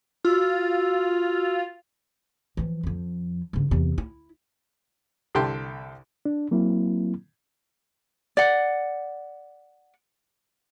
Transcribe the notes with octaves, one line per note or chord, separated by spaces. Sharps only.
F4 F#4 E6
E3 F3
F2 F3
G2 C#3
E2 C3
E4
C2 D3 G4 G5 A5 C6
D4
F#3 A#3 C4 E4
D5 F#5